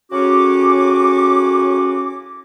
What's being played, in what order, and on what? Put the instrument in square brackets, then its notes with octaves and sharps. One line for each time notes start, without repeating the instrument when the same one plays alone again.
[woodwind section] A2 C#3 C#4 F#4 D6